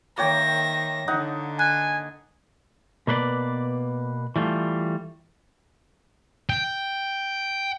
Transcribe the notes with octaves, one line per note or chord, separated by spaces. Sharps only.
D#3 A#3 C#5 E5 G5 A#6
D3 D#4 F#5
G#5 F#6
B2 A#3 B4 C5 D5
E3 G3 A3 F4
G5